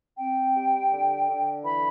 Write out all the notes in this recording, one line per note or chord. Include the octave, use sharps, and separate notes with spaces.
C4 G5
G3
D3
D3
E3 B5